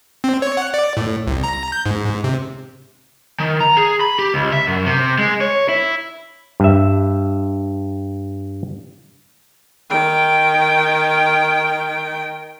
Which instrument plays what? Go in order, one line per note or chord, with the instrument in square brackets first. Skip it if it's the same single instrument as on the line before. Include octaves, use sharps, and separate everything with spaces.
[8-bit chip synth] C4
C#5
F#5
D5
A2
C2
A#5
G6
G#2
C3
[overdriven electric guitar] D#3
A#5
G#4
B5
G4
C#2
E5
F#2
C3
G#3
C#5
E4
[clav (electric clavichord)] G2 E5
[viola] D#3 G5